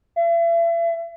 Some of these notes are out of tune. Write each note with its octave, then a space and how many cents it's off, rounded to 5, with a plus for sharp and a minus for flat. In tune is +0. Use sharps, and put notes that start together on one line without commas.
E5 +40